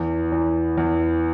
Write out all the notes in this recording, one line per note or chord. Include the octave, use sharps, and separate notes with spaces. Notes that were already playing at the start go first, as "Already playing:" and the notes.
Already playing: E2
E2
E2